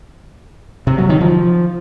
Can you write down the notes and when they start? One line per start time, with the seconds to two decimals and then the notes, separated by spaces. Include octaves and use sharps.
0.87 C3
0.98 F#3
1.09 D#3
1.21 F3